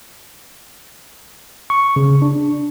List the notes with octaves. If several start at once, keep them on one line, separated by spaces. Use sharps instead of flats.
C#6
C#3
D4